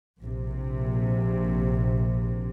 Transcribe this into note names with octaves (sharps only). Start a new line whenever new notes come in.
A#1 C3